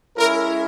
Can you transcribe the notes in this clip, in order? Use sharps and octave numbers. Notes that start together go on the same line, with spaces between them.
G#3 C#4 E4 A#4